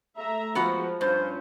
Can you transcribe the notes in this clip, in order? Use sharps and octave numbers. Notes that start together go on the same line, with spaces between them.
A3 E5 A#5
F3 G#3 B3 F#4 F#5
G2 C#4 F4 C5